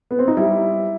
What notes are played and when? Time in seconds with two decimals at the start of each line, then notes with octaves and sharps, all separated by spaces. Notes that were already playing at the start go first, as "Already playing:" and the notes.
0.11 B3
0.19 C4
0.28 D#4
0.37 G3 E4